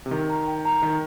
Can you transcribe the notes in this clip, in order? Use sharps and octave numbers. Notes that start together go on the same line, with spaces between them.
C3
D#3 G4
A#5
G5
A#5
D#3 A#4